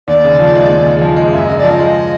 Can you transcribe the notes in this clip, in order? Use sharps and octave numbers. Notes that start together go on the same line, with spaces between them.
D#2 D5
C#3
F3
G#3
D#2
C#3
F3
G#3
F#2 E5
C#3 D#5
F3 D5
D#5
G#3